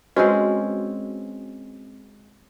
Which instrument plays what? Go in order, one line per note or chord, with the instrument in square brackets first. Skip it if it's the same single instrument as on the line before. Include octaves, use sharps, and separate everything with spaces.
[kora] G#3 C4 C#4 [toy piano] F#4 B4 D#5